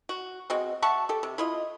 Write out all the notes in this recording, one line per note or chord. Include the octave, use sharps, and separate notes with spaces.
F#4
B2 G#3 C4 F#4
E5 F#5 A5 C#6
G4 A4
C3
E4 F4 D#5